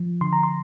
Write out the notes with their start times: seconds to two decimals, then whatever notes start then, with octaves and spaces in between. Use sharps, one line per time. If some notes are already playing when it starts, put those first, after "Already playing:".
Already playing: F3
0.21 D3 C6
0.33 A#5
0.43 C6